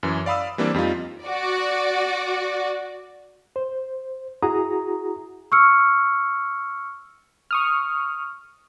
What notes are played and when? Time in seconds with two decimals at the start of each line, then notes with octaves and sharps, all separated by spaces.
0.03 F#2 E3
0.26 D5 F5 B5 D#6 E6
0.58 E3 G3 A#3 C4 D4
0.74 F2 G3 D#4 F4
1.23 F#4 D5
3.56 C5
4.42 E4 F#4 G#4 A#5 D#6
5.52 C#6 E6 F6 C#7
7.51 C#6 D#6 F6